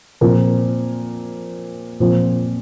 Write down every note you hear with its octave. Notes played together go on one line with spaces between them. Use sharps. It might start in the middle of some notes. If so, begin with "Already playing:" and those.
A#2 F3 C4 A#4
A#2 F3 C4 F4